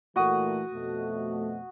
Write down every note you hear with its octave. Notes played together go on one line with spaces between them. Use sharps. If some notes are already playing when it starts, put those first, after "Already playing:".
A#2 E3 A3 F#4 D#6
F2 B2 A3